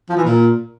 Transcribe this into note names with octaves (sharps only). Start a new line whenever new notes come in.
F3
E3
A#2